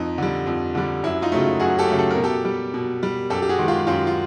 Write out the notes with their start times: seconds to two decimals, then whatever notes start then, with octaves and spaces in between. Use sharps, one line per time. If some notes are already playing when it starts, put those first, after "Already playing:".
Already playing: F2 D#4
0.18 D3 G3
0.47 F2
0.75 D3 G3
1.04 F#2 E4
1.22 D#4 F4
1.32 C#3 F#3 A3
1.60 F#2 F#4 G#4
1.78 G4 A4
1.88 C#3 F#3 A3
1.99 A4
2.11 A#4
2.16 B2
2.24 G4 A4
2.45 G3
2.74 B2
3.03 G3
3.30 F#2 G4 A4
3.42 G4
3.49 F#4 G#4
3.59 D#3 G#3
3.68 F4 G4
3.87 F#2 F4 G4
4.07 F4